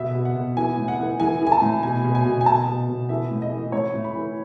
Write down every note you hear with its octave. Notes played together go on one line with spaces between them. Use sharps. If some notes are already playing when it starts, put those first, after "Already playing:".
Already playing: B2 E5
B2
F#5
B2
E3 G#5
A2
F#5
E3
E3 G#5
E3
G#5
A5
A2
B2 G#5
B2
G#5
B2
G#5
B2 A5
B2
B2
E3 E5
A2
D#5
E3
A2 C#5
A2
B5
E3